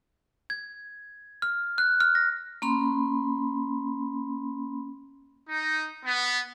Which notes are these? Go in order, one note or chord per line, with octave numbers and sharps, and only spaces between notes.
G#6
F6
F#6
F6
A#6
A#3 C#4 B5 C6
D#4
B3